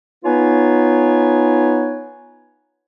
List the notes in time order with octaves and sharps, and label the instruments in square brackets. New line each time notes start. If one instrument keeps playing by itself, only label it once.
[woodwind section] B3 D#4 F4 B4 C#5 G#5